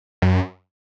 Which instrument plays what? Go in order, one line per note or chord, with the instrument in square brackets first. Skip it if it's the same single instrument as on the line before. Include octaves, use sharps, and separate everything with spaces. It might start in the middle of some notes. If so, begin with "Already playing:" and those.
[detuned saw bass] F#2